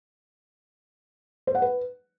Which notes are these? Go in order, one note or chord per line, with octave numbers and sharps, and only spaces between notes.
C5
F#5
B4